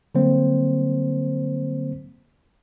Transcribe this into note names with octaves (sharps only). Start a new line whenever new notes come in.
D3 F#3 G3 A#3 C4 C5